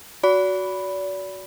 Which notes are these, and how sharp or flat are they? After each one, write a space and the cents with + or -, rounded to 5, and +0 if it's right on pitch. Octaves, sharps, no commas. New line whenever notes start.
F#4 +0 D5 -40 B5 +0